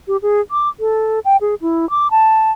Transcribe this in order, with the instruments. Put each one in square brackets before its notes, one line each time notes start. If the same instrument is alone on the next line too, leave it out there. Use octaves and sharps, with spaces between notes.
[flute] G4
G#4
D6
A4
G5
G#4
E4
D6
A5